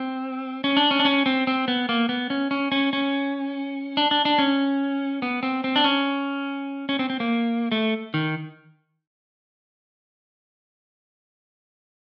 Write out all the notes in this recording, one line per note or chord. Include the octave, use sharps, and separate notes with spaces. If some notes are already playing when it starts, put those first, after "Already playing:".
Already playing: C4
C#4
D4
C#4
D4
C#4
C4
C4
B3
A#3
B3
C#4
C#4
C#4
C#4
D4
D4
D4
C#4
B3
C4
C4
D4
C#4
C#4
C4
C4
A#3
A3
D#3